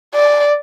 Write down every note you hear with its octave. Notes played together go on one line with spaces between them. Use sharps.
D5